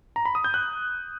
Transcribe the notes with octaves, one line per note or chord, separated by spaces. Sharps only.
A#5
B5
D#6
G6
F#6